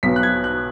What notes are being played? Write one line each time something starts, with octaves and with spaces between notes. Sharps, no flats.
B1 B2 F#3 B3 B6
F#6
G#6
F#6